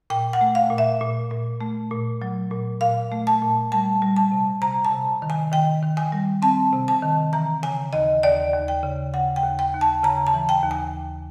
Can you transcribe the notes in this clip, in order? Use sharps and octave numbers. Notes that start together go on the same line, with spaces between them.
A#2 G5
F#5
A3
F5
A#2
E5
A#2
A#2
A3
A#2
F#3
A#2
A#2 F5
A3
A5
A#2
G3 A5
G3
A5
C3
C3 A#5
A5
C3
D#3
G#5
D#3 G5
D#3
G#5
G3
C4 A5
C3
A5
D#3
E3 A#5
C#3 G#5
D#2 D#5
D#2 D5
D#2
G5
C#3
C#3 F#5
G5
D#2
G5
D#2
A5
C#3 A#5
A5
E3
G5
D#2
G#5